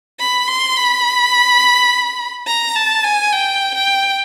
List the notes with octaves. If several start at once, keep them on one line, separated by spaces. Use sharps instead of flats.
B5
C6
B5
A#5
A5
G#5
G5
G5